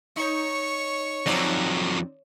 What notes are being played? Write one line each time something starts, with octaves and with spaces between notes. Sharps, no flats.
D#4 C#5 C#6
F2 F#3 C4 D#4 D5